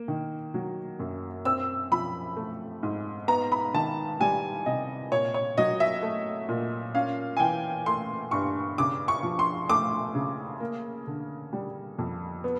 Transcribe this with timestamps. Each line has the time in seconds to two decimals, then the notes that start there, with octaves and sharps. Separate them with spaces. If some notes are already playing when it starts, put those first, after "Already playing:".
Already playing: A#3
0.08 D#3
0.54 F#3
0.99 F#2
1.45 C4 E6
1.92 F3 B5
2.36 A3
2.83 G#2
3.28 B3 A#5
3.52 B5
3.74 D#3 A5
4.20 G3 G#5
4.66 C3 D#5
5.11 A#2 C#5
5.34 C#5
5.58 F#3 D#5
5.80 E5
6.03 A3
6.49 A#2
6.94 C#4 F5
7.37 G#5
7.40 E3 G5
7.86 A3 C6
8.31 G2 C#6
8.78 C#3 D6
9.08 C#6
9.23 F3
9.39 C6
9.69 A3 D6
10.15 C#3
10.60 A#3
11.07 D3
11.53 G3
11.99 F2
12.44 B3